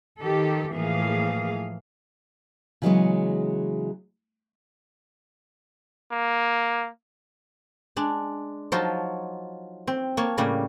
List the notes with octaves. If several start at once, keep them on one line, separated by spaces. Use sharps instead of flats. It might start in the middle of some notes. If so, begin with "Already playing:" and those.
D#3 G4 A4
A2 E3 F3 A#3 G#4 F5
C#3 E3 F#3 G#3 B3 C#5
A#3
G#3 D4
F3 F#3 D#4 F4 A5
C4
A#3 C#5 A5
A2 C#3 G3 A#3